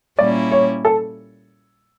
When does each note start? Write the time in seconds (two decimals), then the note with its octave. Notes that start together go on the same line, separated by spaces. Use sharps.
0.18 A#2 G3 A#3 C#4 E4 D5
0.51 C#5
0.85 A4